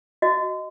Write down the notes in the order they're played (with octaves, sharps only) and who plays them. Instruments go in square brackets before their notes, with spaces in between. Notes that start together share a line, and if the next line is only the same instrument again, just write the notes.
[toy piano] F#4 D#5